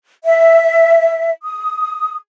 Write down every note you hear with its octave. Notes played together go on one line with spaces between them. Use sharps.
E5
D#6